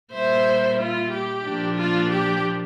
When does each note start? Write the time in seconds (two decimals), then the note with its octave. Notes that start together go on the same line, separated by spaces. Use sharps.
0.13 A#2 G3 A#3 E4 C5 E5
0.79 F4
1.11 G4
1.45 A#2 F3 A#3 D4
1.77 F4
2.11 G4